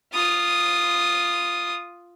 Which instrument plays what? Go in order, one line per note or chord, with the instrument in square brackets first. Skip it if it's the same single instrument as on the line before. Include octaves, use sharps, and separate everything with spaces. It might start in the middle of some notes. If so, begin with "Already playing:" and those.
[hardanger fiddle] F4 D#6